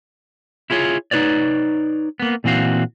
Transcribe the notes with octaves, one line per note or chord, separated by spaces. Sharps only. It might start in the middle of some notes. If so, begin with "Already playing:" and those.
E4 F4 G#4 C#5
D#4 F4 B4 C#5 D5
A#3 B3
A#2 E3 C4 F#4 F5